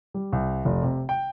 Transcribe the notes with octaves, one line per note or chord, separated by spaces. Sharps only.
G3
C2
F1
C3
G5